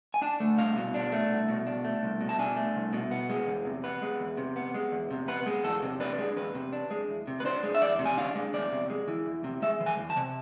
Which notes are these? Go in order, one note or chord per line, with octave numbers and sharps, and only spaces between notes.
G#5
D4 A5
A3
C2 F5
B2
D4
A3
C2
B2
D4
A3
C2
B2
A5
D4 G#5
A3
C2
B2
B3
G#3
E2
C3
B3 B4
G#3
E2
C3
B3
G#3
E2
C3
B3 B4
G#3
E2 A4
C3
D4 B4
G#3
E2 B4
C3
D4
G#3
E2
C3
B4
D4 C5
G#3
E5
E2 D5
C3
G#5
D4 F5
G#3
E2 D5
C3
G#3
E3
E2
C3
G#3 E5
E3
G#5
E2
A5
C3